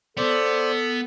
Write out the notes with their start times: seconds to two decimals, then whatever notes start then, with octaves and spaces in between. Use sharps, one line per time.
0.17 B3 A4 C5 D5